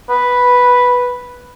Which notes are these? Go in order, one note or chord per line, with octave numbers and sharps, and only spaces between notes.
B4